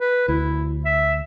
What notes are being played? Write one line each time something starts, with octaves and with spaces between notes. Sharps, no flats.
B4
D2 E4
E5